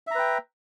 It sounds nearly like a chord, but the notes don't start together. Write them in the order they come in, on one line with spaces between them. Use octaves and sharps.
E5 A#5 B4 G5